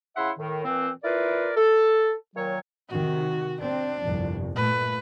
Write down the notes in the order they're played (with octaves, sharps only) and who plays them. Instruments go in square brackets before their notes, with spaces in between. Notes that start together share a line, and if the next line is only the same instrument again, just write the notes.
[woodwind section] C#3 E4 E5 F#5 C6
A2 D#3
A#2 E3 C4
E4 F4 A#4 B4 D5
A4
A#2 D#3 F#3 C#5
[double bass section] C3 D#3 [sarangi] F#4
[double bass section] C4 [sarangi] D4
[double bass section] G1 C2 F2
[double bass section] A#2 A3 [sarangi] B4